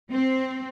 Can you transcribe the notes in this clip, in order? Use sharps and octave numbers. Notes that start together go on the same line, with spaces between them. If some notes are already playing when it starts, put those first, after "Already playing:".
C4